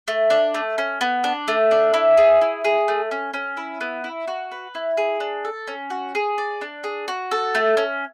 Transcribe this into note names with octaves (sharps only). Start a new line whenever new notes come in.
A3
D4
A3
C#4
B3
D4
A3
D4
E4
G#4
E4
G#4
A3
C#4
C#4
E4
B3
E4
F#4
B4
E4
G#4
D4
A4
C#4
F#4
G#4
D5
D4
G#4
F#4
A4
A3
C#4